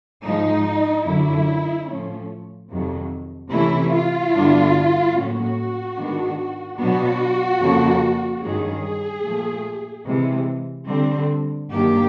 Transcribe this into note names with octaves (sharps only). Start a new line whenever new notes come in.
G#2 F3 G#3 D#4
F#2 D3 F#3 E4
A2 F3 A3 C#4
F2 C3 D#3 F#3
C3 E3 A3 C#4 E4
F4
G2 D3 G3 B3 D4
A2 F#3 A#3 C#4 F#4
G#2 D#3 G#3 B3 D4
B2 F#3 B3 D4 F#4
F2 C#3 F3 A#3 C#4
G2 D#3 G#3 C#4 G#4
A#2 F3 A3
C3 E3 G#3
D3 G3 C4
G2 D#3 F#3 A#3 D4 G4